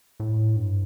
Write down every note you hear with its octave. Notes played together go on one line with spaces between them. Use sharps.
A2
G2